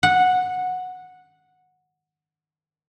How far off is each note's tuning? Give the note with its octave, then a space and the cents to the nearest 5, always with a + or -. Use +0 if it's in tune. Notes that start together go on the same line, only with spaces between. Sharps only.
F#5 -10